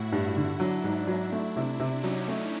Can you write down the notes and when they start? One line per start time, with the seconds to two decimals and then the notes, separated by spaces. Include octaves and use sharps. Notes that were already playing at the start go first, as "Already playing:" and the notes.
Already playing: A2 E4 F#4
0.12 G2 E4 F#4
0.36 D3
0.60 F#3 D4 E4
0.84 G#2
1.07 F#3 D4 E4
1.32 A3
1.56 C3
1.80 C3
2.03 F#3 C#4 D#4
2.28 A3